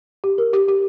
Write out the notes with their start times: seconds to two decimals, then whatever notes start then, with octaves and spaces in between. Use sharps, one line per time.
0.24 G4
0.38 A#4
0.53 G4
0.68 G4